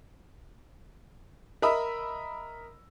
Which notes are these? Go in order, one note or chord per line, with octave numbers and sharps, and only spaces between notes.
A#4 D#5 E5 B5 D#6 E6